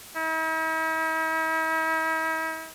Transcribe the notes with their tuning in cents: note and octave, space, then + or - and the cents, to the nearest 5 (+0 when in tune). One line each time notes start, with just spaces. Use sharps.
E4 -45